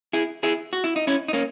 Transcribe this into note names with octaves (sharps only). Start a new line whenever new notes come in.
E4 G#4
E4 G#4
F#4
E4
D#4
C#4 E4
D#4
A#3 C#4